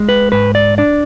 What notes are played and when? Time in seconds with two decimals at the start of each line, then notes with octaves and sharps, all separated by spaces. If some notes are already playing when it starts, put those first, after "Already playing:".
Already playing: G#3
0.09 B4
0.32 G#2 B4
0.55 D5
0.78 D4 D5